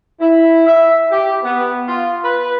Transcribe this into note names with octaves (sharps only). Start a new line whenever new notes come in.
E4
E5
G4
B3
F4
B4